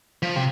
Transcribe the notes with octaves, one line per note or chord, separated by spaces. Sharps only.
F3
C3